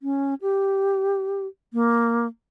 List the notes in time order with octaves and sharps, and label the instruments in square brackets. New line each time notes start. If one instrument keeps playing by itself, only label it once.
[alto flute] C#4
G4
A#3